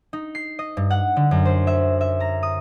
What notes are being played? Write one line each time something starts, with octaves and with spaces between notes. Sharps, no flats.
D#4
C7
D#5
G2
F#5
D3
F#2
C5
E5
E5
A#5
D#6